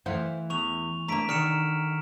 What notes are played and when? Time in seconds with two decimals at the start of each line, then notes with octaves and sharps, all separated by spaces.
0.06 E3 A3 E4 C5 F5 F#5
0.50 E2 C#6 F7
1.08 A3 A#3 D4 A#5 B6 D7
1.29 D3 D#3 F6 C#7 E7